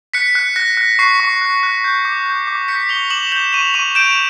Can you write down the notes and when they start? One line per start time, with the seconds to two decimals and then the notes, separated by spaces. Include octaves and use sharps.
0.14 F#6 B6 C#7
0.35 F#6
0.56 F#6 A#6
0.77 F#6
0.99 C#6 C7
1.20 C#6
1.41 F#6
1.63 F#6
1.84 G6
2.05 D6
2.26 G6
2.47 D6
2.68 G6 B6 C#7
2.89 D6 F7 G7
3.10 D6 E7 F#7
3.32 G6 E7 F#7
3.53 C#6 D#7 F7
3.74 C#6 D#7 F7
3.95 G6 D7 E7